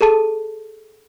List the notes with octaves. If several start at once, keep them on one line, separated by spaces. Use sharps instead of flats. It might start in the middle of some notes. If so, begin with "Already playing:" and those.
G#4 A4 A5 D#7